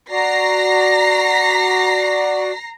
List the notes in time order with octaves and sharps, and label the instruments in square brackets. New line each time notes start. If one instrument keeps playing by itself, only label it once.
[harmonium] F#4 D5 [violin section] A#5 A#6 C7